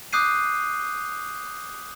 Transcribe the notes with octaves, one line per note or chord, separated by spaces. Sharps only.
D6 D#6 F#6 G6 C7 D#7